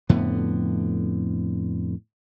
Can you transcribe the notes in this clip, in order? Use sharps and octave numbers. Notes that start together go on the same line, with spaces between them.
F2 A2 D3 B3